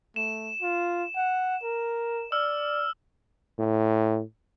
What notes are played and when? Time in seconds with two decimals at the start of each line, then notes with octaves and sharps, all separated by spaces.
0.16 A3 E7
0.62 F4
1.16 F#5
1.63 A#4
2.32 D5 E6 F6
3.59 A2